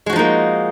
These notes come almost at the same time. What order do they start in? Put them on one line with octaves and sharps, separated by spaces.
G#3 F#4 F3 D#4 A#3